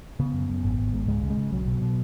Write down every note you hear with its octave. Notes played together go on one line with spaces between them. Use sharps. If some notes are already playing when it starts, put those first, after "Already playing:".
C#3 B3
F#2
F#2
G#1
G#1
G#2
C#2 G#3
C#3
G#3
C#3
B1 F#3
B2
B2